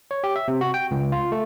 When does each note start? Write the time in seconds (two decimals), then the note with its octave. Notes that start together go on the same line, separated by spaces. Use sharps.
0.11 C#5
0.24 G4
0.36 E5
0.48 C3
0.61 F#4
0.74 G5
0.91 C#2
1.12 F4
1.32 A3